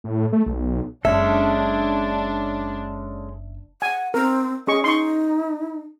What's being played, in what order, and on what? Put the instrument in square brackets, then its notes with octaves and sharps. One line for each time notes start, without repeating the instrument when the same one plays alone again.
[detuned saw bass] A2
A3
B1
[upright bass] F#1 [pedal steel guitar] G#3 C#4 A4 [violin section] D4 [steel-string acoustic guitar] E5
[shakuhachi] F#5 [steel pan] G#5
[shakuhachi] C4 [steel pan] A#4
[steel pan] C#4 G#4 C#6 [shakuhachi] D#5
[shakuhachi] D#4 [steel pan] C6 C#6